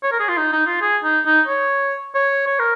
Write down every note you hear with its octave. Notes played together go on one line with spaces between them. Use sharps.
C#5
A#4
G#4
F4
D#4
D#4
F4
G#4
D#4
D#4
C#5
C#5
C#5
A#4